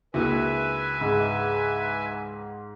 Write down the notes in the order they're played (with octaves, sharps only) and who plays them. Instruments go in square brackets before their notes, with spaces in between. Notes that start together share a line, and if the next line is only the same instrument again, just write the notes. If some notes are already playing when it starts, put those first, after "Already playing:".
[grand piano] C#2 [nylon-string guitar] A#3 D4 F#4 [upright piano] E4 [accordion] B4 E5 G#5
[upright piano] G#2